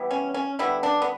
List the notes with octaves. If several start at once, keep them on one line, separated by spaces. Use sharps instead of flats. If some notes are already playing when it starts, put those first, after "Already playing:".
Already playing: E3 G3 B3
C#4
C#4
D3 G3 B3 E4
D4
B3